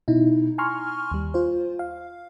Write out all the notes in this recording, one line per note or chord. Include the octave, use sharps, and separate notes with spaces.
B2 D#4 E4
G#5 A#5 C6 C#6 F6
D#2 G3
F4 C5
F5